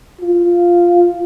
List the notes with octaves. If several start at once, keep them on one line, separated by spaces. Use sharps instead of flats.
F4